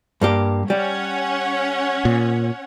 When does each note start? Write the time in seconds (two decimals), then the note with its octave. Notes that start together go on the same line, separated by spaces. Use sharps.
0.21 G2 A#3 G4
0.70 G3 C#4 C#5 F#5
2.05 A#2